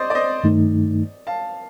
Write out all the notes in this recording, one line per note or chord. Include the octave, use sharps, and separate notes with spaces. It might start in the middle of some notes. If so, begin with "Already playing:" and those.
Already playing: C5 D5 D#5
D5
C5 D#5
G2 D#3 A3 D#4
F5 A5